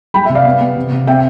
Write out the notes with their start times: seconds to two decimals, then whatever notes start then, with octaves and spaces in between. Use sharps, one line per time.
0.14 G3 G5 B5
0.25 C3 E5
0.35 D5 F5
0.45 B3
0.60 B3
0.76 C3
0.91 C3
1.07 C4 E5 G5